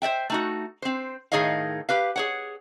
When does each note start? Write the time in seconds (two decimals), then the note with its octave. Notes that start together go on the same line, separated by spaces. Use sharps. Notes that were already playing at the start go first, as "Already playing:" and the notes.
0.02 C5 D5 E5 G5
0.30 A3 D#4 F#4
0.82 C4 C5
1.32 A2 D#3 G#4 C#5 D#5 F5
1.89 G4 B4 F5
2.16 G#4 C#5 F#5